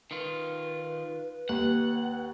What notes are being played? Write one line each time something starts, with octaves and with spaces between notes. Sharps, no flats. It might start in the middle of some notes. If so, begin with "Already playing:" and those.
D#3 F4 B4
D#2 F#5